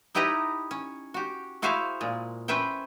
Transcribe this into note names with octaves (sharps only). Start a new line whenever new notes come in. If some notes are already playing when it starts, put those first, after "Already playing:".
D#4 E4 G4 B4 D#5 A#5
C#4
F#4 G4
E4 F#4 G#4 C5 E5 F5
A#2 G#3
C#4 B4 C5 E5 G5